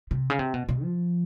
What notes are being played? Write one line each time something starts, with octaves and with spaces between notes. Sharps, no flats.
C3
C#3
C3
B2
B2
F3